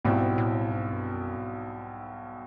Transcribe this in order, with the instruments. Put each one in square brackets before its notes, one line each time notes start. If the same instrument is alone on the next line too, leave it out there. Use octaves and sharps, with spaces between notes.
[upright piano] B1 B2 G3 C4 E4 [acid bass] G#2
[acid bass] A2
G#2
G2
F#2
G#2